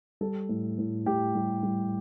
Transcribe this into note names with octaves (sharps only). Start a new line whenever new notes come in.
G3 A4
A2
A2
A2 G4
G3
G3